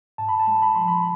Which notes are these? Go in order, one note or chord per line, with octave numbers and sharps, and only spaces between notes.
G#2 A5
B5
A5
G#3
B5
F3 C6
B5